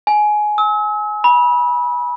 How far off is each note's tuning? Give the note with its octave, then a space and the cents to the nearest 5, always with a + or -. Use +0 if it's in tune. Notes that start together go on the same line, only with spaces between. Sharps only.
G#5 +15
E6 -40
B5 -25